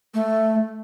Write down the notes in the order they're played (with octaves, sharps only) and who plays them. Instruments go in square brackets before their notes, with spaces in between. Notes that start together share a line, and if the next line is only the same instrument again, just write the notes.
[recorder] A3